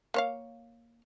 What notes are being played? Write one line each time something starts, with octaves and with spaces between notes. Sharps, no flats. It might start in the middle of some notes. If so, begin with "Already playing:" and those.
A#3 C#5 F5